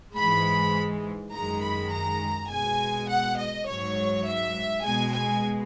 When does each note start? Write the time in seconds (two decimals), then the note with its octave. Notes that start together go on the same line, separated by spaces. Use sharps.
0.16 G#2 E3 G#3 B5
1.32 F#2 D#3 G#3 A#5
1.63 B5
1.92 A#5
2.49 B2 G#3 G#5
3.08 F#5
3.37 D#5
3.66 G#2 F#3 C#5
4.25 E5
4.84 B2 G#3 G#5
5.13 G#5